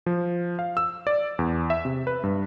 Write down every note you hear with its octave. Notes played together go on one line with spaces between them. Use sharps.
F3
F5
E6
D5
E2
E5
C3
B4
G2